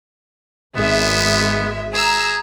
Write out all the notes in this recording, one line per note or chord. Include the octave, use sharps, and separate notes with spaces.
G#1 G#3 B3 E5
G#4 A#5 E6